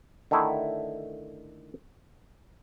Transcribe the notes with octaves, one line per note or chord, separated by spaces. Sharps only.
D3 D#3 A3 E4